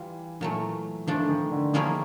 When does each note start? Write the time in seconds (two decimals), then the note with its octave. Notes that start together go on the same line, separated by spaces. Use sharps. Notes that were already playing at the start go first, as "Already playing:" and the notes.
Already playing: E3 G3 F4
0.40 A#2 E3 F#3 A3
1.07 D#3 F3 A3 D4
1.29 D#3
1.51 D3
1.73 D#3 F3 A#3 C#4 E4 G#4